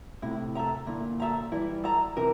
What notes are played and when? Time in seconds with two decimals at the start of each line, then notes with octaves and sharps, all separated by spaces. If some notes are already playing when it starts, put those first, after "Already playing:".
0.22 A2 C3 E4
0.55 A4 E5 A#5
0.87 A#2 D3 E4
1.20 A4 E5 A#5
1.52 E3 G3 E4
1.84 A4 E5 A#5
2.17 C3 E3 A#4